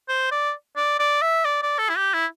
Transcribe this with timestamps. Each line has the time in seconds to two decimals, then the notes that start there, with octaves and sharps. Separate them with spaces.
0.09 C5
0.32 D5
0.77 D5
1.00 D5
1.22 E5
1.45 D5
1.63 D5
1.79 A4
1.90 E4
1.97 G4
2.14 E4